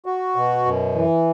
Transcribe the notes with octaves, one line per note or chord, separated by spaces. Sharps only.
F#4
B2
F#2
E3